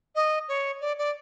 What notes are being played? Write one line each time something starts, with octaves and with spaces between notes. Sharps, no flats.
D#5
C#5
D5
D5